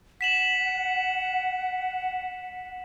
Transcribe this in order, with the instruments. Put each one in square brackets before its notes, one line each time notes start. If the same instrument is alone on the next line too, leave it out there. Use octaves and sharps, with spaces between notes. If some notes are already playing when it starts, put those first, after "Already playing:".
[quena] F#5 [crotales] B6 E7 F#7